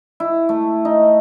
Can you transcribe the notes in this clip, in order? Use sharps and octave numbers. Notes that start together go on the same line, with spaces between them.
E4
A3
D#4